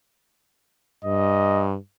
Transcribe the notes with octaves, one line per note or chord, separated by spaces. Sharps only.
G2 D#5